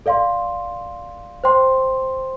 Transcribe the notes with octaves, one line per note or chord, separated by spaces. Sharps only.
A4 D5 F5 C6
C5 G5 C6